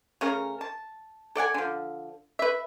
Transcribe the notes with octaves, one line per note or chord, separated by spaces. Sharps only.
C#3 A3 C#4 A#4
A5
A4 D5 F#5 G#5
D3 F3
B4 E5